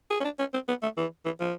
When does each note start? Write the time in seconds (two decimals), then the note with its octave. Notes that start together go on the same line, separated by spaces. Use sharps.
0.10 G#4
0.20 C#4
0.24 D4
0.39 C#4
0.54 C4
0.68 B3
0.83 A3
0.97 E3
1.25 E3
1.40 F3